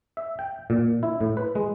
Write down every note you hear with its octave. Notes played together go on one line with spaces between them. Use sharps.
E5
G5
A#2
E4
A2
B4
G#3